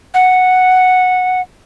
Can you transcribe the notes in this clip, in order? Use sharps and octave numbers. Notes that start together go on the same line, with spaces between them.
F#5